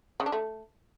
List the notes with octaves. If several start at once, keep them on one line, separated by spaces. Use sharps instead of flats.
C#3
D4
A3